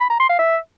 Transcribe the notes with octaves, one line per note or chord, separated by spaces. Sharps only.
B5
A#5
C6
F5
E5